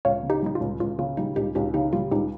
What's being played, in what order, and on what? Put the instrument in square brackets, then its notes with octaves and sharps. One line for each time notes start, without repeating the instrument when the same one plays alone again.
[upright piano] C#2 [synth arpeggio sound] C#5 F5
[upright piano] C#3
[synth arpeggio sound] D#4 G4
[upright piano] G3 [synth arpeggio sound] D#4
[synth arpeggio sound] F4
[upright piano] C#2
[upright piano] C#2 [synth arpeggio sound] F4
[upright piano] C#3 [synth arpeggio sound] F4
[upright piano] G3 [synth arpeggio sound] D#4
[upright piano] C#2 [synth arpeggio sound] D#4 G4
[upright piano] C#2 [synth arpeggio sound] D#4 G4
[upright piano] C#3 [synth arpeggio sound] D#4 G4
[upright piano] G3 [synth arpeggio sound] F4
[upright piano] C#2 [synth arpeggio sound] D#4 G4